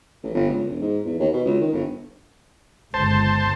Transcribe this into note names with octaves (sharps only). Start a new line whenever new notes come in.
A1
G1
C#2
E1
G#2
E2
D#2
B2
C#2
D#3
G1
G1 C#2 C5 A5